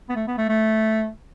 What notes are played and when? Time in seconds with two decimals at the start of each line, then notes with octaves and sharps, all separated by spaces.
0.09 B3
0.16 A3
0.28 B3
0.38 A3
0.49 A3